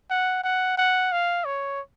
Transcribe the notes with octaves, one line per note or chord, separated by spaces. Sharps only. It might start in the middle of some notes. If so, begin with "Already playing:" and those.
F#5
F#5
F#5
F5
C#5